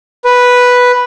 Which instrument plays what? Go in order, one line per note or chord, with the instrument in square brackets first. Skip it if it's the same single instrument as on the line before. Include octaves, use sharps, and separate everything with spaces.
[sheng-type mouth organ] B4